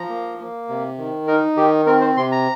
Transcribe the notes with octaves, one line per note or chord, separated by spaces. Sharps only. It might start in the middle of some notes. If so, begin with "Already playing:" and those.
Already playing: F3 A#5
A#3
A#3
C3
D#3
D#4 A#4
D#3 G4
C4 A#4
C5
C3 C6
A#5